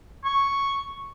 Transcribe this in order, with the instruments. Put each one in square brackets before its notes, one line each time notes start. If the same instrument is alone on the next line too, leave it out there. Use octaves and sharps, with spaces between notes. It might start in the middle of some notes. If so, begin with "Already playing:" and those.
[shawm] C#6